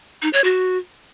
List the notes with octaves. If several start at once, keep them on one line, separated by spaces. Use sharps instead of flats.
D#4
C#5
F#4